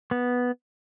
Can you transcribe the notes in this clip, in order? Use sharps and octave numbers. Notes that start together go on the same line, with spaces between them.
B3